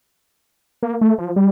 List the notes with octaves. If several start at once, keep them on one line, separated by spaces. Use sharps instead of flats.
A#3
A3
F3
G3